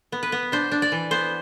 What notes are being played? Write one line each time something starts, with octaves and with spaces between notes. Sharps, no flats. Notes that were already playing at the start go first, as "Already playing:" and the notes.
B3
B4
B3
D4 C5
D4
D5
E3
B3 C5